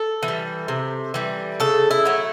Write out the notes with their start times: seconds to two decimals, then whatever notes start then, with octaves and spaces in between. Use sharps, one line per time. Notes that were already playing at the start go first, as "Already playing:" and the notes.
Already playing: A4
0.23 E3
0.28 G3
0.68 C3
1.14 E3 G3
1.60 C#3 A4
1.91 E4
2.05 F#3 A3